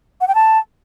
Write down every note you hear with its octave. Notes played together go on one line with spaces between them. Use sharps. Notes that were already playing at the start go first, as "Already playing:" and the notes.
F#5
G5
A5